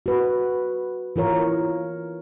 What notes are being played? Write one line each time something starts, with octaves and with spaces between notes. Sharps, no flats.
F#4 B4
E3 F4 A#4 C#5